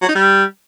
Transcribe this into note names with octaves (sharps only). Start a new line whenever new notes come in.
F#3
D#4
G3